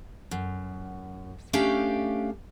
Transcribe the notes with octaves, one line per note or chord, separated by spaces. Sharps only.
F#2
A3 C#4 D4 G4 F5